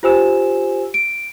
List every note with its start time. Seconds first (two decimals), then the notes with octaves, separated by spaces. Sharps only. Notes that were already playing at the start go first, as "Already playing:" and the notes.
0.03 F4 G4 C5 G#5 E6 E7
0.94 D7